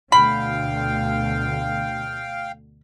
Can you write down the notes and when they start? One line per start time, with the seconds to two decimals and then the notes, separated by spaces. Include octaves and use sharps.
0.12 D2 B2 D3 F5 G5 B5